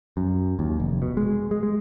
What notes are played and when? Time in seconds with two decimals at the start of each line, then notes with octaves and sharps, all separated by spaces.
0.17 F#2
0.59 D#2
0.80 F1
1.02 B2
1.17 G#3
1.51 G#3
1.63 G#3